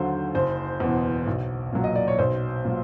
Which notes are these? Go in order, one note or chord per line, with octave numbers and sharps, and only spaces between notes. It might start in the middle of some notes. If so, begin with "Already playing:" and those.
Already playing: D#2 D3 F#3 C5
F#1 C5
E2 B2
B1
A#2 F#3
D#5
D5
C#5
B1 C5
A#2 F#3